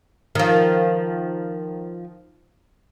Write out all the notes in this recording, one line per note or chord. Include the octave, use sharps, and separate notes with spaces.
D#3 F3